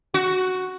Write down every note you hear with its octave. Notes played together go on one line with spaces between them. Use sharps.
F#4